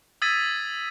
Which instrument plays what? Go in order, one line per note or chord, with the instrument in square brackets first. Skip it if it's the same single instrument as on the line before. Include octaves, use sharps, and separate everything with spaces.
[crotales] D#6 E6 G#6 A6 B6 D#7